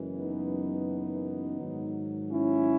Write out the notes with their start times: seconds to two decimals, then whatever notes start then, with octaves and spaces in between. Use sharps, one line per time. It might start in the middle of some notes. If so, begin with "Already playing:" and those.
Already playing: F#1 F#2 E3 G#3
0.16 B3 D#4
1.59 G#2 D#3 F#3
2.30 C#4 E4